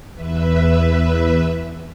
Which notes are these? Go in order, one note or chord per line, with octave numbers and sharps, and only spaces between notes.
E2 B4 E5